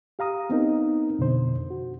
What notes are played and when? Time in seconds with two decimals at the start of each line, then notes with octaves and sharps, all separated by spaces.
0.19 G4 F5 A#5 D#6
0.50 B3 C4 D#4 A#4
1.19 F2 B2 D3 C5
1.70 F#4